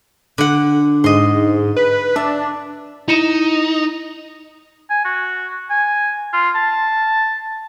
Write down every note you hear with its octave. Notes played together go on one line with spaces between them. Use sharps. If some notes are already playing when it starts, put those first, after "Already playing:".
D3 F#5
G#2 D#5 C6
B4
D4 E5
D#4 E4 C#7 E7
G#5
F#4
G#5
F4
A5